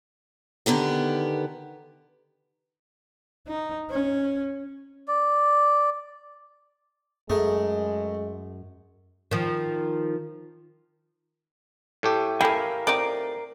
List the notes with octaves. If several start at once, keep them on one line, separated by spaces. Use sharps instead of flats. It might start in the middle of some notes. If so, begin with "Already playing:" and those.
D3 D#3 B3 G4
D#4
C#4
D5
F#2 G#3 A3 G#4 A#4
D#3 F3
A2 A3 G4
E4 A4 A#4 F5 G5 G#5
D#3 C4 D#4 D5